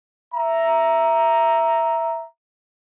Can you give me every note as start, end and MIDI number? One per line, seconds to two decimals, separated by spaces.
0.34 2.25 76
0.34 2.25 82